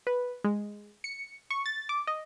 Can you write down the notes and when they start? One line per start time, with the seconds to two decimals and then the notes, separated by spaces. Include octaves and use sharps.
0.07 B4
0.44 G#3
1.04 C#7
1.50 C#6
1.66 A6
1.89 D6
2.07 D#5